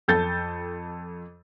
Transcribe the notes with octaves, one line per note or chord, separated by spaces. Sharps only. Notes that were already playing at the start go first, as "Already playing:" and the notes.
F2 A4 G6 A6